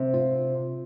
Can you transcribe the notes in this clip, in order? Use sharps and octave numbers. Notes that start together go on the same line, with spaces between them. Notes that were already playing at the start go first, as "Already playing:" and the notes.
Already playing: C3
F4